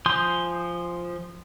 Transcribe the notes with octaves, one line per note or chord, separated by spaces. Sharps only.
F3 G#5 C6 D#6 G6